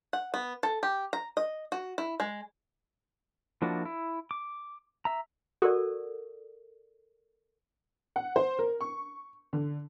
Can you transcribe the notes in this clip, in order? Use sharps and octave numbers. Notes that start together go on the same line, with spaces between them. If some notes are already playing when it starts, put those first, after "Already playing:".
F#5
B3
A4
G4
A#5
D#5
F#4
E4
G#3
F3 A#3 D4 E4 F#4
E4
D6
E5 A#5
F#4 A4 A#4 D5
F#5
C5
A#4
C#6
D3